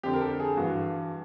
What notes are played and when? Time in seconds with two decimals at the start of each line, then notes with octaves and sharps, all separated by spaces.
0.03 F2 D3 G4
0.13 A#4
0.21 A4
0.40 G#4
0.57 G2 E3 F#4